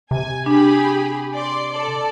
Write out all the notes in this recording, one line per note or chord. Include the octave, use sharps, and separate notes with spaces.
C3 G#5
D4 G4 G#4 B5
D5 C6
A4 D5